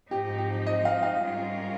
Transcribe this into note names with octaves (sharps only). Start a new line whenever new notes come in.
G#2 F3 C4 D#4 G4
G4
D#5
F5
F5
G#2 G3 C#4 F4 A#4